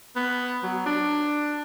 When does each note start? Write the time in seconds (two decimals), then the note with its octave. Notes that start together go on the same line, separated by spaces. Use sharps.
0.16 B3
0.63 F#3
0.86 D4